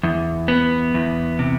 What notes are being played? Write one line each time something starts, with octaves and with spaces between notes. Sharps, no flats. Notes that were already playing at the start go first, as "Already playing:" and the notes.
E2
B3
E2
C3